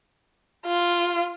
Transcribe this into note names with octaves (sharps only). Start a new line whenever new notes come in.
F4